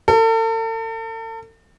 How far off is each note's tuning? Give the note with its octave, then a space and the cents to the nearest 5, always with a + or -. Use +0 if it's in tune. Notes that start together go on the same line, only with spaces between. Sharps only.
A4 +40